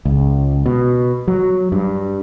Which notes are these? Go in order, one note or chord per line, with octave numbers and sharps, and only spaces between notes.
C#2
B2
F#3
G2